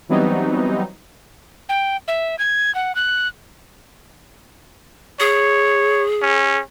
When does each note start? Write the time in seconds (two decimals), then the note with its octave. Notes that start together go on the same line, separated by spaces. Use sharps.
0.09 E3 F#3 G3 B3 C4 D#4
1.69 G5
2.08 E5
2.39 G#6
2.75 F#5
2.95 F#6
5.20 G#4 C#5
6.22 C#4